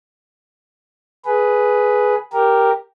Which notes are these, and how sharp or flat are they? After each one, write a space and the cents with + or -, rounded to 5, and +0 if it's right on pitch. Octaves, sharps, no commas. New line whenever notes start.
G#4 +10 B4 +0
G4 +0 A#4 +0